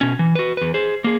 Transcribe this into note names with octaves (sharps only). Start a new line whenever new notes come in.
B2 C#4
E3
F#4 B4
E2 B4
G#4 C5
A#3 G#4